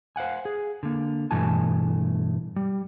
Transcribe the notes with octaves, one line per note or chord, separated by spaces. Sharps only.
C5 F5 F#5 G#5
G#4
D3 A#3
G2 B2 E3 A3 G#5 A5
G3